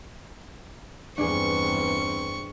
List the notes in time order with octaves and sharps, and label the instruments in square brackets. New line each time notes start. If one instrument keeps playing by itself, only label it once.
[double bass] E2 G2 [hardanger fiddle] C4 C#6 [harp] D4 G#4